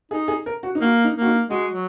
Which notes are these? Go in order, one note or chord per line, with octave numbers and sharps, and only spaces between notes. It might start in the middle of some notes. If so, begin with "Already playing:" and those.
D#4 G#4
G#4
A#4
F#4
D#4
A#3 F#4
D#4
A#3
F#4
D#4
G#3 F#4
F#3